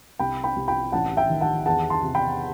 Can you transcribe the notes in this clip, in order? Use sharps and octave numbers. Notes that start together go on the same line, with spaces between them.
C2 G5 B5
G5 B5
C2
G5 B5
A1 F#5 A5
E5 G5
D#3
F#5 A5
E2 F#5 A5
A5 C6
C3
G5 B5